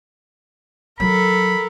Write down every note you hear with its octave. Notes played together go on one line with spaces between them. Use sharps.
D#3 F#3 A4 A#4 B5